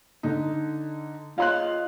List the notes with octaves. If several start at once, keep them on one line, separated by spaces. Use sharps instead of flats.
D3 D#4
F4 C#5 D#5 F5 C6 F#6